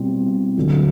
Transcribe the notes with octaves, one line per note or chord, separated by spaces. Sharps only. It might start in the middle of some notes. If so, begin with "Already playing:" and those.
Already playing: B2 G3 C4 E4
D2 D3 F#3 A3